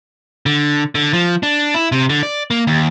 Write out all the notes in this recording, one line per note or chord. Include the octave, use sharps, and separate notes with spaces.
D3
D3
F3
D4
E4
C3
D3
D5
A#3
D#2